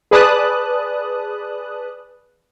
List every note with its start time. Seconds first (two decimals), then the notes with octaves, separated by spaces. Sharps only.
0.11 G#4 B4 D5 A5 D#6 F#6